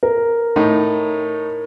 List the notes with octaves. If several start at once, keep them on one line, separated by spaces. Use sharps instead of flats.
A#4
A2 D#4